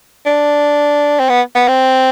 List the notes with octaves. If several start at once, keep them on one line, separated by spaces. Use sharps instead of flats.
D4
C4
B3
B3
C4